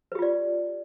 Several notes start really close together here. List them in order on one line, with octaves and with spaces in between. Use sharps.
B4 G4 F4 D5